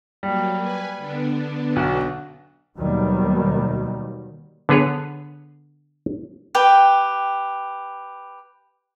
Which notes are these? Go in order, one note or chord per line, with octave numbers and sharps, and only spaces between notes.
F#3 G3 A#3
B4 G#5
D3 B3 D4
B1 F#4
D#2 B2 D#3 F#3 G3
D3 B3 G#4 B4 C#5
G4 B4 G5